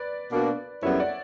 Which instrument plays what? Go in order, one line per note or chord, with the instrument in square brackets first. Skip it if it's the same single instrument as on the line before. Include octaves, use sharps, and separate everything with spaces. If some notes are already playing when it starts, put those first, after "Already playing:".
Already playing: [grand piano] B4 D5
[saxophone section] B2 A#3 D4 F#4
[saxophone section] F#2 D3 G3 B3 E4 [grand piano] C#5 E5
[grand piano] D5 F#5